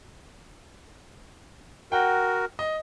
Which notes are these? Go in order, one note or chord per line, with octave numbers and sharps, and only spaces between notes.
F#4 A#4 F#5 G5
D#5